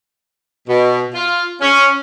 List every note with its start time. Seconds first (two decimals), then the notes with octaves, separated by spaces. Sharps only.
0.68 B2
1.14 F4
1.61 C#4